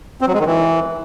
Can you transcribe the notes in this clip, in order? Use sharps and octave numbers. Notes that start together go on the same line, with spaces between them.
C4
F#3
G#3
D#3
E3